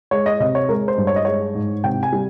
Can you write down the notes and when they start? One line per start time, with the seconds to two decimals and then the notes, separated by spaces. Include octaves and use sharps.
0.11 G#3 C#5
0.26 D#5
0.40 C3 D#5
0.55 C#5
0.69 G#3 A#4
0.88 C5
0.98 G2
1.07 C#5
1.16 D#5
1.25 G#3 C#5
1.55 G#2
1.84 C3 G5
2.03 G#5
2.12 G3